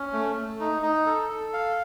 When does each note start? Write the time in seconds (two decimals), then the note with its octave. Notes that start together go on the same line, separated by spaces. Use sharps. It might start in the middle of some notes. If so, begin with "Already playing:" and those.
Already playing: C#4
0.13 A3
0.36 A3
0.60 D#4
0.82 D#4
1.06 A4
1.29 A4
1.53 F5